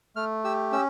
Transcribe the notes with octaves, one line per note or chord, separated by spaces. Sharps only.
A3 F6
G4 E6
C#4 E6